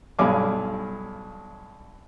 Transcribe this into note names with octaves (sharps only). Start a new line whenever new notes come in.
B1 G2 F5 G#5 D6